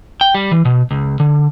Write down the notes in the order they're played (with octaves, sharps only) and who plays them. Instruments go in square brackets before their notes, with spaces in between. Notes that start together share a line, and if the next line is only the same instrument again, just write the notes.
[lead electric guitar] G5
G3
E3
B2
C#2
D3